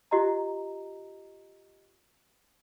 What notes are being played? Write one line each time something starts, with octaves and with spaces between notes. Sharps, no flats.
F4 G4 D#5 A#5